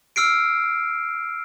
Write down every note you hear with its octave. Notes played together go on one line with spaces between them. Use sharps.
E6 F6 C7 D7